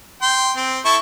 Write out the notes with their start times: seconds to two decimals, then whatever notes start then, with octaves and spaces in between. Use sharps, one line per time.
0.22 G5 C6
0.57 C4
0.85 E4 A4 C#6